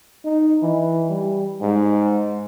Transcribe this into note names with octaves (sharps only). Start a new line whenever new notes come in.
D#4
E3
G3
G#2